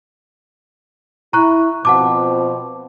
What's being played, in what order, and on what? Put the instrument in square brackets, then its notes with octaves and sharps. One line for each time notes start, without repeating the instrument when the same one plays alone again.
[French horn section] E4 [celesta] A#5 C#6 F#6
[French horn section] B2 F3 C4 [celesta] F#5 A5 D6